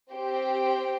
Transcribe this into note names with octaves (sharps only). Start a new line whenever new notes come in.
C4 G4 C5 G5